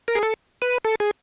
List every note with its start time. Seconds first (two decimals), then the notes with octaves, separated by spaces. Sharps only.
0.08 A#4
0.15 G#4
0.23 A4
0.62 B4
0.85 A4
1.00 G#4